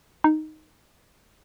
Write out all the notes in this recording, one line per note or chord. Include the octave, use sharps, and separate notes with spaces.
D#4